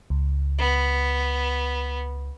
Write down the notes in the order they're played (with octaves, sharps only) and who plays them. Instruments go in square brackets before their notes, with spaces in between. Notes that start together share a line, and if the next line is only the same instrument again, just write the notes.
[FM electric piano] C#2
[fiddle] B3